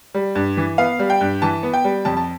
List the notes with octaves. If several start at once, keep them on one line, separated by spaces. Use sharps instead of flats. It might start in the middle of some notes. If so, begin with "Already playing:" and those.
G3
G2
E3
B3 F5
G3
G5
G2
E3 A5
B3
G5
G3
F2 A5
A5